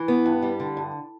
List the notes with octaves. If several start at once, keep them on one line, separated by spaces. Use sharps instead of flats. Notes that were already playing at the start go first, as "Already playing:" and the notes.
Already playing: E3
B3
G2
G3
D3
G2